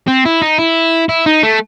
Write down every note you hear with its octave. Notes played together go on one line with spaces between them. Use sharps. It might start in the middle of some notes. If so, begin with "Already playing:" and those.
C4
E4
D#4
E4
E4
D#4
A3